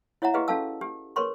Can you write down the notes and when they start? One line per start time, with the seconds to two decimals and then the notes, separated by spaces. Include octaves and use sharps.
0.22 E4 C#5 E5 F#5 A#5
0.34 E4 G4 G#4 B4 D#5 F5
0.48 C#4 F#4 A4 F5 A5 E6
0.81 G4
1.16 G#4 A#4 B4 C#5 C6 C#6